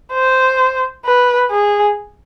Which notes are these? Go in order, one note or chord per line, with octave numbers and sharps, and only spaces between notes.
C5
B4
G#4